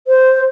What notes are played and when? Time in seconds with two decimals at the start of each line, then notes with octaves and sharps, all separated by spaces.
0.07 C5